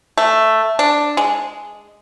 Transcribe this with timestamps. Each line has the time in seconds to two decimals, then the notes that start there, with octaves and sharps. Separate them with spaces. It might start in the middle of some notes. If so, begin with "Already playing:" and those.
0.18 A3
0.79 D4
1.17 G#3